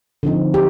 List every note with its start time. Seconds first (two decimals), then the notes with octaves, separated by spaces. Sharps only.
0.23 D3 F3 C4 D#4
0.54 G4